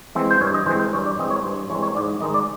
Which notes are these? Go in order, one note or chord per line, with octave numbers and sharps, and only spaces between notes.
E3 G#3 C4
C5
G2 C#5
D#5
E3 G#3 C4 C5
C5
G2 C#5
D5
E3 G#3 C4 D#5
C#5
G2 C5
E3 G#3 C4 C#5
C#5
G#2 D5
D#5
D#3 G#3 D#5
D5